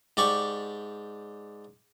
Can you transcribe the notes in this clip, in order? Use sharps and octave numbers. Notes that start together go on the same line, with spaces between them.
G#2 G4 D5 C#6